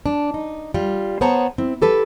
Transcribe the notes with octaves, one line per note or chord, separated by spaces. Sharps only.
D4
D#4
G3 F4
B3 G#4 C5 C#5 A5 A#5
C4 E4
G4 A4 B4